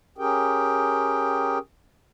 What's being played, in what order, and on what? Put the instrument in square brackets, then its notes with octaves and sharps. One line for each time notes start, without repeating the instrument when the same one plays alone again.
[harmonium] C#4 G4 G#4 A#4 G5